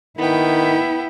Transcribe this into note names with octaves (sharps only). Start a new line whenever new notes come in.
D#3 B3 E4 G5